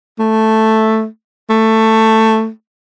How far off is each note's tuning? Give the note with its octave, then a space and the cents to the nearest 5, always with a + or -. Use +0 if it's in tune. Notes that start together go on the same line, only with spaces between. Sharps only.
A3 +0
A3 +10